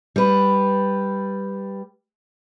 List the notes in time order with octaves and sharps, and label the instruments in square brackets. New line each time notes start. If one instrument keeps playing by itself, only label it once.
[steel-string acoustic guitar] G3 B4